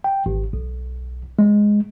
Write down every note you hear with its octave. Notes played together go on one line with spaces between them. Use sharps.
G5
G#1
B1
G#3